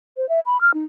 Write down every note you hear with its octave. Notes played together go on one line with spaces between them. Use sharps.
C5
E5
B5
F6
D#4